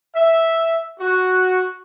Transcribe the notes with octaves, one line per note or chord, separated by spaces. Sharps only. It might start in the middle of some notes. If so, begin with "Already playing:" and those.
E5
F#4